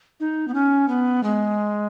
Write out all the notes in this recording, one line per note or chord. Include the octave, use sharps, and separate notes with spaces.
D#4
B3
C#4
B3
G#3